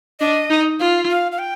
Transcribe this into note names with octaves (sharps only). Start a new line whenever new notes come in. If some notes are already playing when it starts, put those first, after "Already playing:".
D4 D#5
D#4
F4 F5
F5
F5
G5